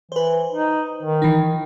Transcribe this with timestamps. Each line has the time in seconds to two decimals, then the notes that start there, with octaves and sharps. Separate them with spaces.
0.12 E3 B4 C5
0.53 D#4
1.03 D#3
1.22 E3 D#4